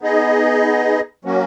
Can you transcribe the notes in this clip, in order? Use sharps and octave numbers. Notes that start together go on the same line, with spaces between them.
B3 D#4 G#4 D#5
F#3 A#3 C#4 F#4